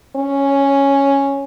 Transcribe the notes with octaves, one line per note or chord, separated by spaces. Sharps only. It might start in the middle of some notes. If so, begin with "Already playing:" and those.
C#4